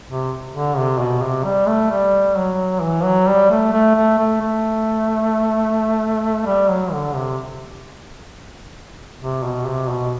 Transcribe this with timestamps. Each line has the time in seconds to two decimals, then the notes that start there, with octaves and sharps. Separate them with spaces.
0.08 C3
0.53 D3
0.77 C3
0.99 B2
1.22 C3
1.45 G3
1.67 A3
1.90 G3
2.36 F#3
2.82 E3
3.04 F#3
3.27 G3
3.50 A3
3.72 A3
3.95 A3
4.18 A3
4.41 A3
6.46 G3
6.69 F#3
6.93 D3
7.15 C3
9.20 C3
9.43 B2
9.66 C3
9.89 B2